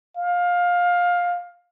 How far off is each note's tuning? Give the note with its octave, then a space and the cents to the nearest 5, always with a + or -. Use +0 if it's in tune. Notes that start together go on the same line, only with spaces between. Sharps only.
F5 +20